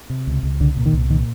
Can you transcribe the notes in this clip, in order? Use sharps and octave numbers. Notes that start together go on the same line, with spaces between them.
C3
C#2
C#2
C2 D3
A#2
D#3
C2
A#2 D#3